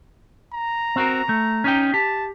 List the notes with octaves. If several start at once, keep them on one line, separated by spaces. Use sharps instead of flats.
A#5
C4 F#4 A#4
A3
C#4 D#4 G5
G4 A5